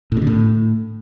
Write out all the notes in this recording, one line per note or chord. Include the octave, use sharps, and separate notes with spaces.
A2
B2
D3
A2